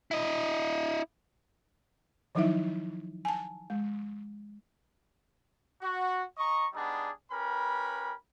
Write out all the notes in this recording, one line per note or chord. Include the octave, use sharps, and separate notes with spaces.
E4 D#5
D#3 F3 F#3 D#4 E4 E5
G#5 A5
G#3
F#4
D#5 A#5 C#6
G3 B3 D4 D#4 G#4
C#4 G4 A#4 B4 B5